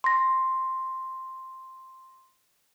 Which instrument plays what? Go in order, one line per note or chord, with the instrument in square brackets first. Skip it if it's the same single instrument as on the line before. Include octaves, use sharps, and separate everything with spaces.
[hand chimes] C6 A#6